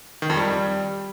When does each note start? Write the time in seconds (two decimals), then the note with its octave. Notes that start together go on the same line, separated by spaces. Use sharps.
0.22 D#3
0.30 F2
0.37 G3